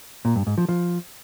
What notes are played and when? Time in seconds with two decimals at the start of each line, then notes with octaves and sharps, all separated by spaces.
0.25 A#2
0.36 G2
0.47 G#2
0.58 F3
0.69 F3